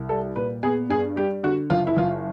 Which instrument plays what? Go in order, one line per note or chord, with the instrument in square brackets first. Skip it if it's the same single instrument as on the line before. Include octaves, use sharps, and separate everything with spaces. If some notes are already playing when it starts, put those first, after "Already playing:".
Already playing: [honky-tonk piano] C2
G3 A4
A#2 B4
B3 G#4
G2 G#4
G3 G4
D3 F#4
F#1 F4
E4
F#1 F4